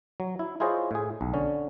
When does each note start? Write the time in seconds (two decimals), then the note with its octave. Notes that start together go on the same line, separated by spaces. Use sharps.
0.20 F#3
0.39 E4
0.60 E4 F4 G#4 C5 C#5 D#5
0.91 A2 G#4
1.21 B1
1.34 D3 C#4